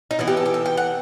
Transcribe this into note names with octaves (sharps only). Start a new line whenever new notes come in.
D#4
E3 B3 E4
G4
A4
G4
A4
G5
F#5